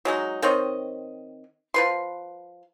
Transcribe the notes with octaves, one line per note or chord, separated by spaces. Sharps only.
F#3 G#3 D#4
D#3 C4 C#5 D#5
F3 B4 C6